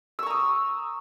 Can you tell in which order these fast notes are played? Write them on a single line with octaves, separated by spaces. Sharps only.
E6 C#6 A#5 D#6